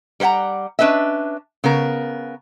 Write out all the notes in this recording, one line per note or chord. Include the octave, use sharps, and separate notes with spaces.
G3 B4 C5 F#5 A#5
C#4 D4 B4 D#5 E5
C#3 B3 A#4